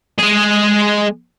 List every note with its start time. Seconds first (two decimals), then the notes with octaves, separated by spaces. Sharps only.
0.19 G#3 G#4